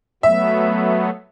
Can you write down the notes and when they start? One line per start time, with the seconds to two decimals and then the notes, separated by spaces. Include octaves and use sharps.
0.23 F#3 A3 B3 E5